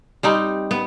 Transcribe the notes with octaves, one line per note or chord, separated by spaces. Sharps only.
G3 C4 D#4
B3